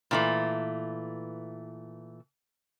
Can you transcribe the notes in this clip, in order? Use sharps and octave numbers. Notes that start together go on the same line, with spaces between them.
A#2 E3 A3